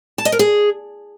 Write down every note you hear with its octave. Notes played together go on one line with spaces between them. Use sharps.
A5
D#5
A#4
G#4